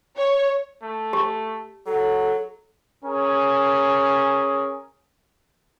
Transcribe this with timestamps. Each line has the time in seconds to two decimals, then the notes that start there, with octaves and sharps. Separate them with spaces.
0.16 C#5
0.83 A3
1.13 G4
1.86 F#3 A4
3.04 C#4 G#4 A#4 G#5